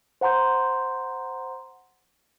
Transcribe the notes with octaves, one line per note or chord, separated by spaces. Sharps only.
C5 F#5 A#5 C6 G6